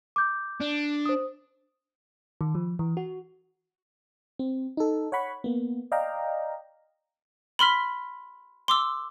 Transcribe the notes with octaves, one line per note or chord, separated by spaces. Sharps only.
D6 G6
D4
C5 D#6
D#3
F3
E3
F#4
C4
D#4 A4
C#5 F#5 B5 C#6
A#3 B3
D5 D#5 F5 G5 A#5
B5 C6 F6 B6
C6 D6 E6